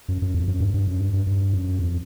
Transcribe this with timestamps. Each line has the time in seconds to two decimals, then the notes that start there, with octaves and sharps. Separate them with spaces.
0.08 F#2
0.22 F#2
0.34 F2
0.48 F#2
0.60 G2
0.74 G2
0.87 F#2
1.00 G2
1.13 G2
1.27 G2
1.53 F#2
1.79 F2